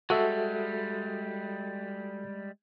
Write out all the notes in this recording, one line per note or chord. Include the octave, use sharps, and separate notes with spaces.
G3 G#3 F#4 A4 E5